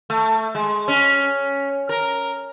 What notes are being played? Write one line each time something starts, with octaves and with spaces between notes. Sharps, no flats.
A3
G#3
C#4
A#4